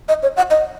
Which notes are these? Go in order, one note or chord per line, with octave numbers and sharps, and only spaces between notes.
D#5
C#5
F#5
D#5